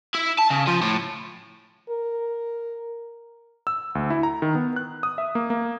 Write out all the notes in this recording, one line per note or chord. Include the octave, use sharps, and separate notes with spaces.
E4
A5
C#3
F3
A2
A#4
E6
D2
E4
A#5
D#3
B3
F#6
D#6
E5
A#3
A#3